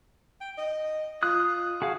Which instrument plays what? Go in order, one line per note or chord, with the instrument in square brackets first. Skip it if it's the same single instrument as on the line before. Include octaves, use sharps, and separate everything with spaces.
[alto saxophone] G5
D#5
[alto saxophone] F4 [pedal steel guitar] D#6 F#6
[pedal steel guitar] F#4 G#4 F5